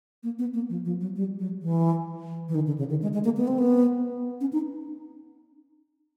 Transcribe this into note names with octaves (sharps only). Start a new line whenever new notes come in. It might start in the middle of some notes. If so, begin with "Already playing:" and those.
A#3
B3
A#3
F3
F3
F#3
G3
F#3
E3
E3
D#3
D3
C#3
D#3
G#3
G#3
A#3
B3
C4
B3
C#4
D#4